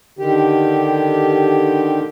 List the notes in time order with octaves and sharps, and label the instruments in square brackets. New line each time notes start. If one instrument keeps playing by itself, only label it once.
[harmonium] D3 D#3 G4